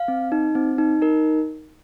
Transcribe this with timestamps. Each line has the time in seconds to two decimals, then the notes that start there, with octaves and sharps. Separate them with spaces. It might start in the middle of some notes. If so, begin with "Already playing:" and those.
Already playing: F5
0.08 C4
0.32 D#4
0.55 C4
0.78 D#4
1.02 D#4 A#4